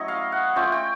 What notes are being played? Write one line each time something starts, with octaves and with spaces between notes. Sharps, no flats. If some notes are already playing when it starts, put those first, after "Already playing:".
Already playing: F#3 A3 C#4 E4 C#5 D#5
F5
F#5
A3 C#4 F4 G5
G5